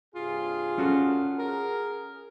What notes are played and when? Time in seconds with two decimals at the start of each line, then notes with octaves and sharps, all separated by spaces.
0.15 G2 C3 F4 G#4
0.78 C#4 F#4 A4
1.38 G#4 A#4